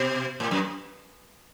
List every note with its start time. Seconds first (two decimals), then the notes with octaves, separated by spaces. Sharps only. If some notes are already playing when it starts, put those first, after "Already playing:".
Already playing: B2
0.40 A2
0.51 F#2